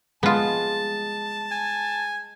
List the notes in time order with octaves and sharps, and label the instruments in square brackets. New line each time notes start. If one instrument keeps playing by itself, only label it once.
[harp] G#3 [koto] B3 F4 [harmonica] A5
[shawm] G#5